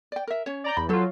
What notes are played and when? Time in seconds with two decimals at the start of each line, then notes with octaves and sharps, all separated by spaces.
0.12 D5 G5
0.27 A#4 E5
0.46 C#4 C#5
0.64 D5 A#5 G6
0.77 E2 B5
0.89 F#3 F4 A4 C5